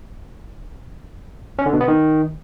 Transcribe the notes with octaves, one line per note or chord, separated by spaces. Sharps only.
C#4
D3
B2
B3
D#3